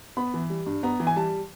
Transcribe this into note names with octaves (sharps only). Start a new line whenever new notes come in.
B3 B5
E3
G3
G2
B3 A#5
E3
G#5
G3 A5